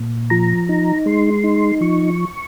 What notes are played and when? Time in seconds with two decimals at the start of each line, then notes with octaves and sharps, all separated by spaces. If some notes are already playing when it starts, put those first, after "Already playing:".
Already playing: A#2
0.30 F3 A#5
0.69 D#4
1.06 G#3 C6
1.44 D#4
1.81 F3 C#6